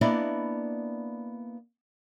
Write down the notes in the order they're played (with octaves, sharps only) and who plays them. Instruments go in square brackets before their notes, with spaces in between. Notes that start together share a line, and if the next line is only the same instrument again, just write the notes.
[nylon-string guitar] A#3 B3 D4 E4 D5 D#5